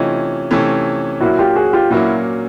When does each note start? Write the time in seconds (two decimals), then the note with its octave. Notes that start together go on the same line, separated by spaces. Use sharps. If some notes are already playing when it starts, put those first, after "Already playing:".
Already playing: C3 E3 A3 C#4 D#4 F4
0.51 C3 E3 A3 C#4
1.20 A#2 F#3 A#3 C#4 E4 F#4
1.39 F4 G4
1.56 F#4 G#4
1.73 F4 G4
1.91 A#2 F#3 A#3 C#4 E4 F#4